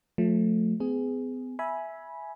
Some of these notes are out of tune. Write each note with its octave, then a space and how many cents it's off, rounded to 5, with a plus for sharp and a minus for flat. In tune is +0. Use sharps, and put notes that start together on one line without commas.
F3 +35 A3 +0
B3 +45 G#4 +0
E5 +0 G#5 +10 B5 -15